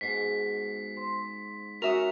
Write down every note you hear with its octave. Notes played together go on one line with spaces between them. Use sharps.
G#2 B2 B6 C7
C5
C#4 F#4 A#4 E5 G#5 D#6 F7